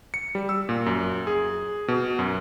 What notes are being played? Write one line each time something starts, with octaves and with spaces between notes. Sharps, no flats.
C#7
G3
E6
A#2
F#2
G#4
B2
F#2